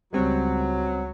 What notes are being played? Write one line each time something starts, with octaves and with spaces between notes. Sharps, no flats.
C#2 F#3 G3 C4